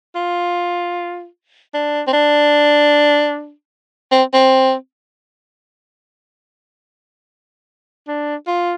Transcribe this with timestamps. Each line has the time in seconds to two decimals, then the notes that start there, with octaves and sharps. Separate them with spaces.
0.15 F4
1.74 D4
2.07 C4
2.13 D4
4.11 C4
4.34 C4
8.07 D4
8.47 F4